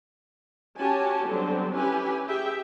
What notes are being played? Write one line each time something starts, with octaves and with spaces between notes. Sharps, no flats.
C#4 F#4 G4 C#5 G#5 A5
D3 F#3 G3 B3 C4 D4
C#4 E4 G4 B4 G#5
G4 G#4 E5 G5